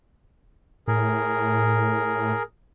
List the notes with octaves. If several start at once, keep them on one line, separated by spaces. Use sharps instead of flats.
A2 G#4 A#4